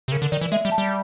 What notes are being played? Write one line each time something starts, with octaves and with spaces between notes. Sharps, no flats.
C3
C#3 A#4
D3
D#3 D5
E3
G#3 E5
G3
A5
G3